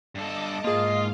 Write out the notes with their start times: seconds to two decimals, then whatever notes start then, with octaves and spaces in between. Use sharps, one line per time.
0.15 G2 A4 D#5 A5 D6
0.64 G#2 A#3 F4 G#4 D#5 F5